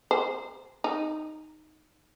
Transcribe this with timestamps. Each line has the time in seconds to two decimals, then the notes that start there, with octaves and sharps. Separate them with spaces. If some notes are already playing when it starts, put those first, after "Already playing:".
0.11 C5
0.84 D#4